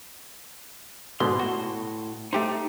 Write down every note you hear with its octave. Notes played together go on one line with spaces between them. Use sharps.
G#2 B2 D3 C6
A2 F#4
A3 D#4 G4 C5